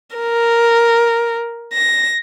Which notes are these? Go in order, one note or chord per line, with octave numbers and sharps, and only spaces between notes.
A#4
A#6